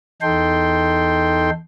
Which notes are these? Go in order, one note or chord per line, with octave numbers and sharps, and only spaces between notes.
E2 D#4 A4 G5 C6